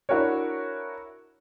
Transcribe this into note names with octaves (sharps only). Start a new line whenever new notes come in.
D4 E4 F#4 A#4 C#5